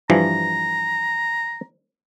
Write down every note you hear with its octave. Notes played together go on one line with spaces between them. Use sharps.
G2 E3 F3 A#5